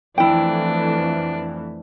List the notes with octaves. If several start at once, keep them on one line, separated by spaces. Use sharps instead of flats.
F2 E3 A3 D4 E4 G5